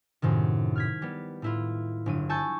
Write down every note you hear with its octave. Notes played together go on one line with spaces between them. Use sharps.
F#2 A2 C3 D#3
F6 G#6 B6
G3 B3
A2 E4 F4
G1 F#3 D#7
G#5 A5 C#6 E6 G6 A6